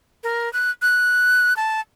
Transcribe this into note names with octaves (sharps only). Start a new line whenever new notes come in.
A#4
F#6
F#6
A5